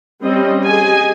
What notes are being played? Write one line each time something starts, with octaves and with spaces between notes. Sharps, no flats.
G3 C4 C#4 D#5
G4 G#4 D#5 G#5